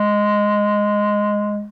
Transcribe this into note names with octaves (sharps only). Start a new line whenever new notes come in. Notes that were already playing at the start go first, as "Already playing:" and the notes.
Already playing: G#3